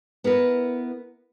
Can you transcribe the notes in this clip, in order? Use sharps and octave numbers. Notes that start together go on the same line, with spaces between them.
B3 E4 A#4 B4